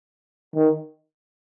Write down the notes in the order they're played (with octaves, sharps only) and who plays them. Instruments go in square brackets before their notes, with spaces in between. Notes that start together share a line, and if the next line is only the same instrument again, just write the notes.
[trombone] D#3